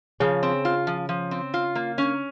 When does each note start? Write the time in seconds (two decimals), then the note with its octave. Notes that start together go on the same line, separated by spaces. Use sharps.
0.20 C#3 F3
0.43 C4
0.65 F4
0.87 F3
1.09 F3
1.31 C4
1.54 F4
1.75 A#3
1.98 C#4